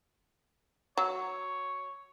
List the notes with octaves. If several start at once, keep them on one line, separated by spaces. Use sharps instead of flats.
F#3 C#5